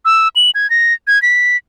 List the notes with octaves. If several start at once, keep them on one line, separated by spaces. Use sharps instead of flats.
E6
F#7
G#6
A#6
G#6
B6